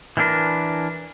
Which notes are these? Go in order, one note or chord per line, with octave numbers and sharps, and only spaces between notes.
E3 G3 A#3 D4 A#4 B4